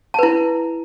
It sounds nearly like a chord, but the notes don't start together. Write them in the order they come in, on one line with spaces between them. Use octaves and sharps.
A5 B4 E4